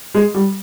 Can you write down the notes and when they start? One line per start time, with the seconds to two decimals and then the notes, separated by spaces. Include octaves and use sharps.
0.15 G#3
0.34 G3